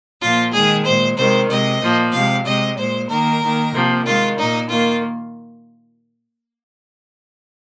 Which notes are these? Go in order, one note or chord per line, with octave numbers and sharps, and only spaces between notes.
A#2 F3 A#3 F4
D#3 G#3 G#4
A#2 G#3 C5
C3 D#3 G#3 C5
C3 G#3 D#5
A#2 F3 A#3
C3 G#3 F5
C3 G#3 D#5
A#2 G#3 C5
D#3 A#3 A#4
D#3 A#3
C3 F3 A#3
D#3 G#3 F4
A#2 A#3 D#4
D#3 A#3 F4